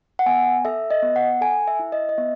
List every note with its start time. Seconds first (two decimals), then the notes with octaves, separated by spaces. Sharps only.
0.19 F#5
0.26 B3 G#5
0.65 A4 E5
0.91 D#5
1.03 B3
1.16 F#5
1.41 A4 G#5
1.67 E5
1.79 E4
1.92 D#5
2.09 D#5
2.18 B3 E5